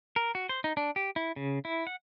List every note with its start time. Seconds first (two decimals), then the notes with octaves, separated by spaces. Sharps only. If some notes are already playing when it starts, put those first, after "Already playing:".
0.16 A#4
0.35 F#4
0.49 C5
0.64 D#4
0.77 D4
0.96 G4
1.16 E4
1.36 C#3
1.65 E4
1.87 F#5